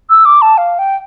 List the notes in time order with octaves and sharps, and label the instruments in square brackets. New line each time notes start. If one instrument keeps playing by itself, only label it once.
[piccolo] E6
D6
A5
F5
G5